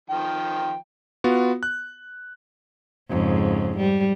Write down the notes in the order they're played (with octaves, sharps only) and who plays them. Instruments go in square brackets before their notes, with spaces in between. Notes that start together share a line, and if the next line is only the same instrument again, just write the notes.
[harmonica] D#3 F3 G5
[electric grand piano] B3 F4 F#4
F#6
[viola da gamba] F2 G#2 C#3
G3